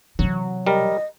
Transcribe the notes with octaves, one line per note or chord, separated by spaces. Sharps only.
C3 E3 F#3
G3 A#4 D#5